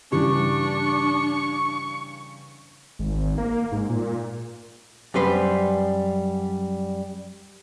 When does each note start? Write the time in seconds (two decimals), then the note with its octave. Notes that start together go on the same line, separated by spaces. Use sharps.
0.12 G2 C#3 E3 D4 C#6
2.99 G#1
3.38 A#3
3.72 G#2
3.89 A#2
5.14 F#2 G3 B4 C5